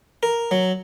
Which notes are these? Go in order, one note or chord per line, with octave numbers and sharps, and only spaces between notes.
A#4
F#3